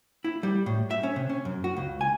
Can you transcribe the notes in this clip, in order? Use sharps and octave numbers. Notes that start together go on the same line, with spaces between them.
E4
G3
A2
E5
C#4
C3
C#4
F#2
F#4
C#2
G#5